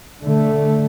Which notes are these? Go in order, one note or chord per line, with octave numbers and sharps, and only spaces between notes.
D3 A3